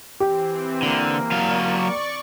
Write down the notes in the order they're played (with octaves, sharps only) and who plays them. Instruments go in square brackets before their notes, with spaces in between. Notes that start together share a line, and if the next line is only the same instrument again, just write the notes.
[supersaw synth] E3 C4 [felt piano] G4
[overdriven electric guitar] D3 [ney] A#3
[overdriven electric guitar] F#3 F5 [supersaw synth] D5 C#6